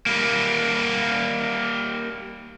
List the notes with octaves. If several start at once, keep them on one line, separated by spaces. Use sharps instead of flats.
G3 A#3